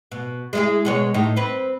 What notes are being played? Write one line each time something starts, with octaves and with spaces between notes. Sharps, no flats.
B2
G#3 E4 G#4
B2 G#3 C#5
A2 D#4
C4 B4